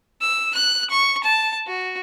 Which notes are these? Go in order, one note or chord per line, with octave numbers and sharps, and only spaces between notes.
E6
F#6
C#6
A5
F#4